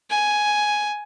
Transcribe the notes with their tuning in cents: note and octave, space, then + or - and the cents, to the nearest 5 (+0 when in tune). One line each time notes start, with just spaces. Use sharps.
G#5 +5